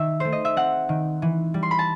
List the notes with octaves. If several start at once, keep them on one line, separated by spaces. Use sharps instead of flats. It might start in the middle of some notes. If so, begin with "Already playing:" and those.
Already playing: D#3 E5
A3 C5
D#5
E5
C4 F#5
D#3
E3
G3
C6
B5
A5